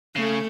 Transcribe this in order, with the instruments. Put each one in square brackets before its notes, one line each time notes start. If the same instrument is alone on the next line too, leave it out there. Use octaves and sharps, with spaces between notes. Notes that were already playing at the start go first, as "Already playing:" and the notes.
[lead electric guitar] C#3 [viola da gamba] A3